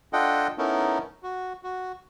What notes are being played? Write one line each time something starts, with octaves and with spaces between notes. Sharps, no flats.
D4 F4 A4 D#5 F#5 G5
B3 C#4 D#4 E4 A4 A#4
F#4
F#4